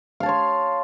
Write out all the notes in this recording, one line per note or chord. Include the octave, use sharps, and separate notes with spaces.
C#5 F5 A5 C6